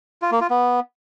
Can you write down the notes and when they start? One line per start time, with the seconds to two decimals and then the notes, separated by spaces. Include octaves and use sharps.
0.22 F4
0.31 A#3
0.41 F4
0.50 B3